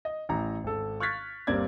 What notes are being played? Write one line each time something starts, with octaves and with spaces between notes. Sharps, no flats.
D#5
A1 E3 A#5
G#1 A4
C#6 F6 F#6 G#6 A6 B6
G1 G3 A#3 C4 D5 G#6